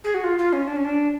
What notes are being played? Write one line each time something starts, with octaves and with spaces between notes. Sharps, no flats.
G#4
F#4
F4
F4
C#4
D4
C#4
D4